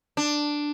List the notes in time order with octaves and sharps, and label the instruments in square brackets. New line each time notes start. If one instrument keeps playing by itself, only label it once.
[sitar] D4